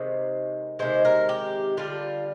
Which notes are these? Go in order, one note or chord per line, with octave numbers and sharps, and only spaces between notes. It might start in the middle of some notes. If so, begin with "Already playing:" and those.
Already playing: C3 D#3 G#3 C5
C3 D#3 G#3 C5
A#4
G4
D3 G3 F4